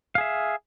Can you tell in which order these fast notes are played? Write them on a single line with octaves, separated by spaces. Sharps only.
F5 G#4 E5